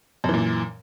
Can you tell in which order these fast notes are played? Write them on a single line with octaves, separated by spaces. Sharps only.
F#2 E3 A#2